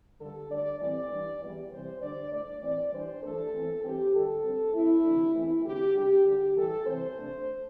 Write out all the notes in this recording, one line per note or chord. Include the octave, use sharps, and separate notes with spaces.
G2 D3 G3 A4
D2 D3 G3 D4 D5
A2 E3 G3 C4 D5
G2 E3 G3 D4
E2 E3 G3
C3 E3 G3 C5
D2 D3 G3 D4 D5
A2 A3 D4 D5
A2 E3 C4 D5
G2 E3 G3 D4 C5
G2 E3 A3 D4 A4
E2 E3 C4
G2 E3 C4 G4
G2 D3 G3 A4
G2 G3 C4
A2 A3 C4 E4
D2 C3 E3 A3 D4
E2 E3 A3 C4 E4
G2 D3 C4 G4
C3 G3 D4 G4
D2 D3 G3 G4
A2 E3 G3 A4
C3 E3 C4 C5
C3 A3 D4